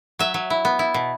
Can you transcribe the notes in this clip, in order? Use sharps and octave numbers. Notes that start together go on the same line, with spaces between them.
F#3 E5
F#3
E4
B3
E4
B2